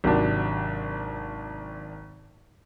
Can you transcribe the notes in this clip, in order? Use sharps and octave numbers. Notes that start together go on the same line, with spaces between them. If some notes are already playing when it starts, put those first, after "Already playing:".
G#1 C3 F#3 D4